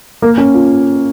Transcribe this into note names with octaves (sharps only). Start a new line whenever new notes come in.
A#3
C#4
F4